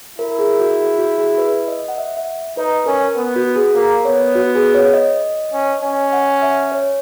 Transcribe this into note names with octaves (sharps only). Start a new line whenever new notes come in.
E4 A#4
A#4
G#4
F#4
G#4
F#4
G#4
B4
D#5
F#5
E5
E5
D#4 B4
C#4 A#4
B3
F#4
G#4
A#3 A#4
B3 C#5
F#4
G#4
C#5
D#5
C#4
C#4
F#5
E5
C#5